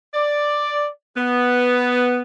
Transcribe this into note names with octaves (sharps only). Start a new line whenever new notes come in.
D5
B3